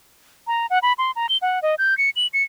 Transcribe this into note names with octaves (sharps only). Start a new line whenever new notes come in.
A#5
F#5
B5
C6
A#5
G7
F#5
D#5
G6
C#7
F#7
C#7